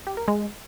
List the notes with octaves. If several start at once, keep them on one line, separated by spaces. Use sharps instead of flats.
G4
A#4
G#3